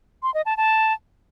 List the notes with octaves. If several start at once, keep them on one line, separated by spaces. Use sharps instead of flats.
C6
D#5
A5
A5